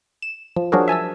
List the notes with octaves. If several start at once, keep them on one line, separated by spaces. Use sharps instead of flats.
E7
F3
F3 F#3 D4 F#4 G#4 A#4
E5 G#5 A5 E6